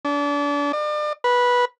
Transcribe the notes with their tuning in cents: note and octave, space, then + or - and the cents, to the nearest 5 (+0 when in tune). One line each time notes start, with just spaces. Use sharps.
D4 -30
D5 +40
B4 -15